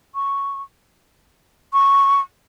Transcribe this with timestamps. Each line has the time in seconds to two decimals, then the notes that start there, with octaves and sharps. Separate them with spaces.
0.15 C#6
1.73 C#6